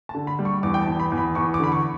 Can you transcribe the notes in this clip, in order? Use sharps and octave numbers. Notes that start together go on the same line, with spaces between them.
A5
D3
B5
G3
C#6
E2 D6
G5
A5
E2
B5
E2
B5
E2 C#6
D6
D3 B5
C#6